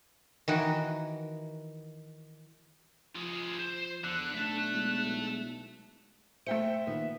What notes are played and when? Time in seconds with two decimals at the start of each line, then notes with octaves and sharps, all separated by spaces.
0.48 D#3 E3 F#4
3.16 F3 F4 G#4
3.59 C5
4.04 E2 D3 F#6
4.35 B1 A3 D4 E5 A5
4.74 G#3 B3 E4
5.05 B1
6.47 A3 C5 E5 G5 C#7
6.87 A#2 D#3 B3